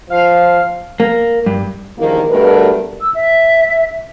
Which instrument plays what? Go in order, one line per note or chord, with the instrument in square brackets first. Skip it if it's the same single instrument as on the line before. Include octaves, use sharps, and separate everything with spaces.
[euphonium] F3 [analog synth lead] F5
[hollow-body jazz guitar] A#3
G2
[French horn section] E2 G2 D#3 F3 A#3
G2 B2 G3 A3 A#4 B4
[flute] E6
E5